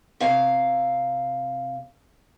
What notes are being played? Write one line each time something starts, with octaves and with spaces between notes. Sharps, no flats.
C3 F5